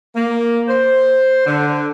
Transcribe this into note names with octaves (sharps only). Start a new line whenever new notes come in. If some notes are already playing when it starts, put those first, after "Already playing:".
A#3
C5
D3